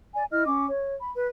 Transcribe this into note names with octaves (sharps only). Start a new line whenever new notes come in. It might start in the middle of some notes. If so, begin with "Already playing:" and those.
D5 G#5
E4 D#5 F6
C#4 D6
C#5
B5
B4